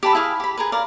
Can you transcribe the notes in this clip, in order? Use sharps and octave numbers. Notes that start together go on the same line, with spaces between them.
G4 A5 B5
E4 G#4 F5
G4 B5
G#4 A#4 B4
A#4 D5 F5